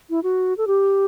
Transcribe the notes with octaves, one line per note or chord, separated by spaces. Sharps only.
E4
F#4
A4
G4